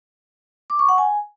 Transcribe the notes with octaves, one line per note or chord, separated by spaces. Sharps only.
D6
C#6
F#5
G#5